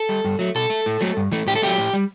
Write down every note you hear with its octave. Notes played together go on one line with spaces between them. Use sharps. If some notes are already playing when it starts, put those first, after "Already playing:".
Already playing: A4
G3
G2
F#3 A3
B2 A4
A3
A2
F#3 A3
G2
E3 A3
A2 G4
A4
F#3 A3 G4
A2
G3